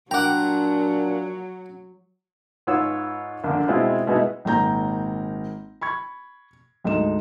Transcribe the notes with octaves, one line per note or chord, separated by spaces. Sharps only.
A#2 F#3 D4 F#5 G5 A#5 D6
G#2 F4 B4 C#5 E6
A#1 D3
B2 G#3 C4 E4 F4
B2 G#3 B3 D#4 E4
G#1 A#2 A#5 G6
B5 C#6 G#6
D2 G#2 D#4 E7